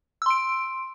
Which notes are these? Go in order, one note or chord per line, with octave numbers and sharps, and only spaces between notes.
C6 E6 D7